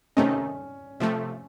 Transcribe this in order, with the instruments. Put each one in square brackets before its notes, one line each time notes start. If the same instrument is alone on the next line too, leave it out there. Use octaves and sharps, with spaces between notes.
[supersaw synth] C3 D#3 A3 D#4 [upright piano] C#4
[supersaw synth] C3 F3 A3